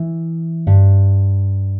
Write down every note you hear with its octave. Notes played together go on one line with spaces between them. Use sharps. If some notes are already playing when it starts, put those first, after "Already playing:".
Already playing: E3
G2